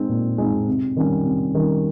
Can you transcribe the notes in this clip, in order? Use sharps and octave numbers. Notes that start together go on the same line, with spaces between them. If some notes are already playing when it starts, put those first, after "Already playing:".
Already playing: G#3 C4 D#4
A#2
G#3 C4 D#4
C3
D#3 G3 C#4
C3
D#3 G3 C#4